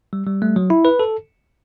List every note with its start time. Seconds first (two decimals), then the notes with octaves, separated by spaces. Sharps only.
0.13 G3
0.27 G3
0.42 A3
0.56 F#3
0.70 E4
0.85 B4
0.99 A4